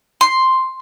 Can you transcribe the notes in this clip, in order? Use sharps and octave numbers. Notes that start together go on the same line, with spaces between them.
C6